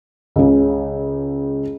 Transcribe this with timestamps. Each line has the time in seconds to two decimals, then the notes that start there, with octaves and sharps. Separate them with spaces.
0.36 C#2 C#3